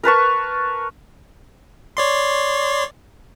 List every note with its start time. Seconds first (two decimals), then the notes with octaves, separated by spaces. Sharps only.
0.03 A#4 B4 A5 C#6
1.97 C#5 D5 C6